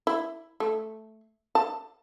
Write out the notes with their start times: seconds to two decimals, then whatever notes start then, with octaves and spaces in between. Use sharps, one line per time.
0.07 E4
0.60 A3
1.55 A5